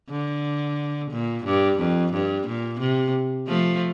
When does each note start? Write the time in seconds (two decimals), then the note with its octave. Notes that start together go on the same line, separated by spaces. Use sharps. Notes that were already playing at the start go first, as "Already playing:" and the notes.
0.10 D3
1.11 A#2
1.45 G2
1.78 F2
2.13 G2
2.47 A#2
2.80 C3
3.47 F3 A3